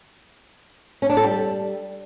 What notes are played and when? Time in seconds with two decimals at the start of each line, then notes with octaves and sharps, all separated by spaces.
1.02 C#4
1.10 D4
1.17 A4
1.24 G3